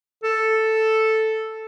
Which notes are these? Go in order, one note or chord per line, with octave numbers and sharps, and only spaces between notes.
A4